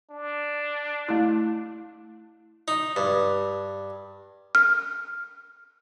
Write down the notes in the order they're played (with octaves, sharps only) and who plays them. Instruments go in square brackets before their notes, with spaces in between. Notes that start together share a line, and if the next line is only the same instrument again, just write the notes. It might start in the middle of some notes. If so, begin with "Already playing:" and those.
[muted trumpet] D4
[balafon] A3 E4
[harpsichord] D#4
G2
[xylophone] F6